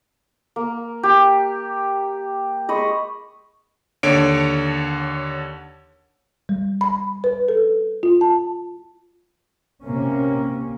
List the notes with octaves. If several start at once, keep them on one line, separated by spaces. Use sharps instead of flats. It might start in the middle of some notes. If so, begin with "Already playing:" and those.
A#3
G4
G#3 D#5 B5 C#6
D#2 D3 C#5 D7
G3
B5
B4
A4
F4
A5
C3 A#3 C#4